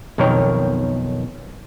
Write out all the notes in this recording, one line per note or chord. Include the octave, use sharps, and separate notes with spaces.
B1 F2 D#3 A#4 C#5 G5